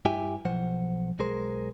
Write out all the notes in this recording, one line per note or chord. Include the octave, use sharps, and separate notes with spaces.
G2 E4 G4 E5 G5 G#5
B1 F3 C5 F#5
B1 G#3 G#4 A#4 C5